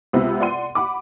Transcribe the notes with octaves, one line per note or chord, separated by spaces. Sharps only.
C#2 C3 B3 C4
D5 F#5 C6 D#7
F#5 B5 D6